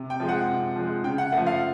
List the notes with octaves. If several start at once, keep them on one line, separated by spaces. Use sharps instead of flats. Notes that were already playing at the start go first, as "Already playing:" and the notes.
Already playing: C3
G5
F3 G#3
F#5
C3
F3 G#3
C#3 G5
F#5
F3 A3 F#5
F5